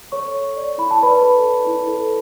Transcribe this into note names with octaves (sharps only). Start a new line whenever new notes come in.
A4 C#5 C#6
A4
D5
E4 B5
A5
B4 D5 B5
A4
E4
E4
A4